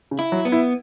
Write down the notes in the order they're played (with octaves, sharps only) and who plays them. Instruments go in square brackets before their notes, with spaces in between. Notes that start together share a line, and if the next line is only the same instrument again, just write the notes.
[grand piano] C#3
[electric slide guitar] E4
[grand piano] F#3
[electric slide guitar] B3
[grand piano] E4